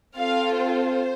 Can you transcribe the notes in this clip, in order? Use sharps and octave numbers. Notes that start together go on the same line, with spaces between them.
C4 F4 A4 F5
C5